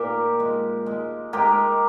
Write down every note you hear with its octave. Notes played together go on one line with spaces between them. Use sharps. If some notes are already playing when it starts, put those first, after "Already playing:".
Already playing: A#2 G4 A#4
G#3
G#3
G#3 G4 A#4